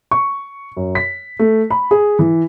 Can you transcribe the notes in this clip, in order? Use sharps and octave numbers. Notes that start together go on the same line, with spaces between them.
C#6
F#2
B6
A3
B5
G#4
E3